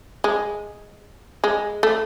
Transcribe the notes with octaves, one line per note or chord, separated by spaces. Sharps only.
G#3
G#3
A3